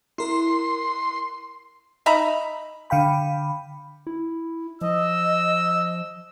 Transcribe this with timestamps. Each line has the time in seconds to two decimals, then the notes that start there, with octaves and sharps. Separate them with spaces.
0.18 E4 A#4 C6
2.06 D#4 E5 A#5 B5
2.90 D3 F5 G5 B5
4.07 E4
4.81 F3 D#5 E6